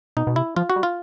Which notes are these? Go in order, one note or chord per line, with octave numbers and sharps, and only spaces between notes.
B2 D#4
B2
C3 E4
F3 F4
F#4
G3
F4